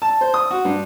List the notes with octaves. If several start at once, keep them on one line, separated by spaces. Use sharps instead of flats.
A5
C5
D#6
F#4
G2